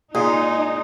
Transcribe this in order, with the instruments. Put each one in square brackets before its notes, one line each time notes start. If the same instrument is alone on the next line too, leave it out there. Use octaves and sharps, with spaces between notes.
[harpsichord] A#2 [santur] G#3 G#4 [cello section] D#4